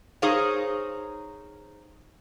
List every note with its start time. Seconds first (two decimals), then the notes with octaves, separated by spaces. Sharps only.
0.22 D#4 G#4 A#4 C5 C#5 F5